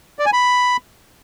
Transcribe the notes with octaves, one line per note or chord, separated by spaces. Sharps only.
D5
G#5
B5